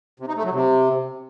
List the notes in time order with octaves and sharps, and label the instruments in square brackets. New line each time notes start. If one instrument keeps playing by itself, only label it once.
[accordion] C3
D#4
A3
F#3
C3